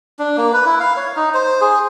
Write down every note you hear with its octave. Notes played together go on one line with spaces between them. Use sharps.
D4
A#3
B4
E4
F5
C#5
D#4
C5
G#4